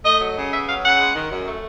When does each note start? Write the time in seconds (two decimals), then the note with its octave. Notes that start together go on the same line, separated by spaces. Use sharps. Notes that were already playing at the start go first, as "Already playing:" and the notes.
0.04 A3 D#5
0.21 F#3
0.37 C#3
0.52 B3 E5
0.68 F#3 F5
0.84 C#3 F#5
1.00 G#3
1.15 D#3
1.31 F#2
1.46 A3